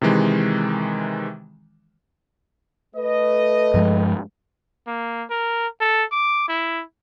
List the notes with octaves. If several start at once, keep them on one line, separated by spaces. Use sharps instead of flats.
C3 D#3 E3 G#3
A3 B4 D#5
G2 F3 G#3
A#3
A#4
A4
D6
E4